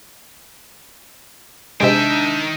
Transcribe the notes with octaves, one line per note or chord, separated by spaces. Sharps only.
C3 D#3 G#3 D4 E5 G5